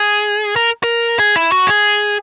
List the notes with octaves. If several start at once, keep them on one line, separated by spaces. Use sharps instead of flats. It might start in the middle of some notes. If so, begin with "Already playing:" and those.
Already playing: G#4
A#4
A#4
G#4
E4
F#4
G#4